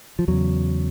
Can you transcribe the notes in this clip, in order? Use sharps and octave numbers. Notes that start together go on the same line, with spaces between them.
F3
E2 C#3 F#3